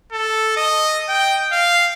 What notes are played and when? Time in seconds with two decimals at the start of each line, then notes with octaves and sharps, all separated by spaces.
0.12 A4
0.56 D#5
1.09 G5
1.52 F5